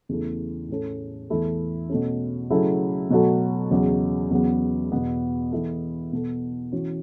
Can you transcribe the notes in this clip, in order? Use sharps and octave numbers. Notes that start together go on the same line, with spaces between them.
E2 C#3 E3 A3
A2 A3 C#4 A4
E2 E3 A3 E4
B2 A3 C#4
C#3 F#3 A3 E4 A4
B2 F#3 A3 F#4 A4
E2 C#3 F#3
E2 C#3 F#3 B3
E2 B2 B3
E3 B3 E4 A4
B2 B3 A4
E3 C#4 F#4